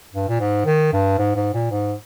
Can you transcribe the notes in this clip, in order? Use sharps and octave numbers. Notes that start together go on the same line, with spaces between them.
G2
A#2
G#2
D#3
G2
G#2
G#2
A#2
G#2